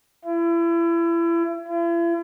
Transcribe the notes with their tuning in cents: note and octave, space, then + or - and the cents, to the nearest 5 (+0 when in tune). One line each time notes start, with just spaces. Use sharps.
E4 +35
E4 +45